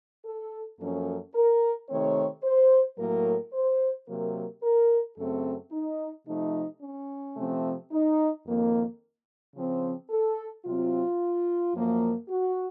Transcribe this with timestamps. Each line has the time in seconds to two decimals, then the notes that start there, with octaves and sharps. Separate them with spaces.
0.25 A4
0.79 F#2 F3 A#3 C#4 A4
1.35 A#4
1.89 C3 D#3 A3 C4 C#5
2.43 C5
2.98 A2 F#3 A#3 A#4
3.53 C5
4.08 C3 F#3 A#3 A#4
4.62 A#4
5.17 F#2 C#3 A3 C4 A4
5.71 D#4
6.26 C3 F3 A3 D#4
6.82 C#4
7.36 C3 F3 A3 C4
7.91 D#4
8.45 F2 D#3 A#3
9.55 C#3 F3 C4
10.10 A4
10.64 C3 F#3 C4 F4
11.75 F#2 F3 A#3
12.29 F#4